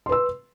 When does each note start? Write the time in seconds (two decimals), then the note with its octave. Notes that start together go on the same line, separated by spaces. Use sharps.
0.06 C6
0.09 B4
0.12 E6